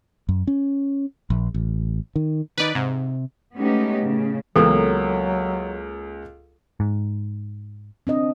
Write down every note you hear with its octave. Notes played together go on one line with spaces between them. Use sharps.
F#2
C#4
A#1
A1
D#3
D#3 D#4 B4 D5
G#2 C3
G#3 A3 B3 C#4 D#4 G4
A2 C#3
C#2 E3 F#3 A#3 B3 G4 A4
G#2
C4 D4 D#5